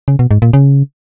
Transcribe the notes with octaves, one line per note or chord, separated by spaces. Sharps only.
C#3
B2
G#2
A#2
C#3